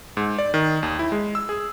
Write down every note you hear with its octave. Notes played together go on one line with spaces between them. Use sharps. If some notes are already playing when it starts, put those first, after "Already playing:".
G#2
D5
D#3
D#2
E4
G#3
E6
G#4